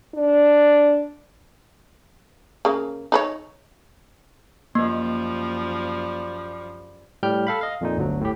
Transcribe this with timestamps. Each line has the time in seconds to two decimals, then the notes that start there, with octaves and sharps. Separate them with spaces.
0.14 D4
2.65 C#3 A#3
3.12 D#4 B4 C#5
4.75 F#2 F3 G3 A#3
7.23 A2 G3 G4 G5 F6 G6
7.47 A4 F5 B5
7.61 D#5 F5
7.81 F2 A#2 D#4
7.97 G1 D2 F#3
8.21 A2 G4